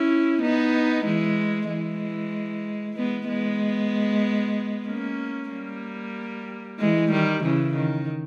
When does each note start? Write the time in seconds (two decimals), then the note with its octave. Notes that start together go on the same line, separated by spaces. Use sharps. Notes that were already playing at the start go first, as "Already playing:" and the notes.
Already playing: C#4 E4
0.42 B3 D#4
1.05 E3 G#3
1.69 E3 G#3
2.97 G#3 B3
3.29 G#3 B3
4.88 A#3 C#4
5.52 G3 A#3
6.80 E3 G#3
7.11 D#3 G3
7.43 C#3 E3
7.75 D#3